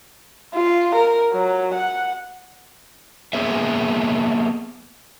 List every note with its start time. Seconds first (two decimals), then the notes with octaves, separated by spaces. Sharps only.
0.55 F4
0.96 A#4
1.33 F#3
1.75 F#5
3.33 A#3 B3 G#4 C5 D#5 E5